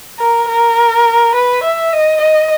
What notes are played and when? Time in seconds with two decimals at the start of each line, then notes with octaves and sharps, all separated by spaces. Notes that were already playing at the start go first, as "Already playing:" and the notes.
0.19 A#4
0.49 A#4
1.35 B4
1.63 E5
1.93 D#5
2.21 D#5